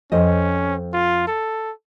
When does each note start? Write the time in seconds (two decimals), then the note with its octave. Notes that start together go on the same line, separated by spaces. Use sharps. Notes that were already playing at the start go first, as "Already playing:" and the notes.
0.12 F2 C#4 C5 D#5
0.94 F4
1.28 A4